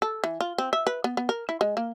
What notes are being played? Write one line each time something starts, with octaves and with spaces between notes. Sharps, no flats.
A4
E3
F4
C4
E5
B4
B3
B3
A#4
E4
G#3
A#3